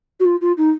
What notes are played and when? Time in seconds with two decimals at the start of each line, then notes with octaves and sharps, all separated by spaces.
0.20 F#4
0.25 F4
0.41 F4
0.57 D#4